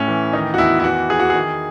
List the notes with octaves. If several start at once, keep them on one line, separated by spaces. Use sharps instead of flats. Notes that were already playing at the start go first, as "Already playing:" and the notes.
Already playing: A2 C#4
E3
D#3 D#4
F#4
E2 E4
E4
E3 F#4
E3 G#4
F#4
D#3 G#4